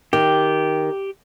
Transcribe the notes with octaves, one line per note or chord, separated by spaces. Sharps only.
D#3 G4